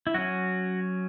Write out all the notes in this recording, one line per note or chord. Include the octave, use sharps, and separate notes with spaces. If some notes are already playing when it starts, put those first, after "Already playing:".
E4
F#3 C#4 F#4